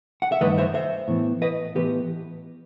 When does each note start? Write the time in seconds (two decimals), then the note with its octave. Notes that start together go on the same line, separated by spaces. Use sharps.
0.22 F#5
0.32 E5
0.41 G2 D#3 A3 B4 D#5
0.58 C5 E5
0.74 C5 E5
1.08 A2 E3 B3
1.42 B4 D#5
1.75 A2 E3 B3 G4 B4